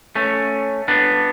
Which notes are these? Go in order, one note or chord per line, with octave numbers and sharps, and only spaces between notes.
A3 C#4
B3 D4